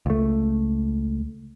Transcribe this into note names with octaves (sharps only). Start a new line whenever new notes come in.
C#2 A3